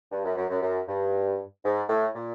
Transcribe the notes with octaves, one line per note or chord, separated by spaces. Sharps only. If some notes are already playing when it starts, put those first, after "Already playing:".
G2
F#2
F#2
F#2
F#2
G2
G#2
A2
A#2